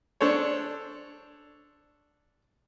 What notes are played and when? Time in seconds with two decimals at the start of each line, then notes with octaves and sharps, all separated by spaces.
0.21 D4 A4 C5 C#5